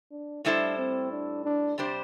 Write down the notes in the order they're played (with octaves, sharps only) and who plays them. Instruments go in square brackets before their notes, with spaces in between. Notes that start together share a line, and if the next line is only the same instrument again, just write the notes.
[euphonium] D4
[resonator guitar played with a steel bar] A2 G3 E4 A4 C5 [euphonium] D4
[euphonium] C4
D4
D4
[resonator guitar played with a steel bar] C3 G3 D4 G4 C5